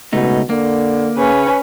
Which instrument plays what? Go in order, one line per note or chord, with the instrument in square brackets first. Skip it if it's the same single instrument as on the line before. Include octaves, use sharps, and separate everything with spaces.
[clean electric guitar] C#2 A3 D#4 [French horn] B2
[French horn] D3 [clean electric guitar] A#3
[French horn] C#3 [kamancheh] C#4 B4